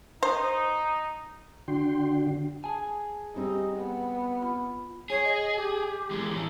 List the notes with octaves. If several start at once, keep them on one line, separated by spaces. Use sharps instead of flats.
D#4 C5
D3 D4 F#4 G5 C6
G#4 G#5 A5
G3 C4 D#4
B3
F4 B5
G#4 C#5
D#5
G4
E2 G#3
A2 E3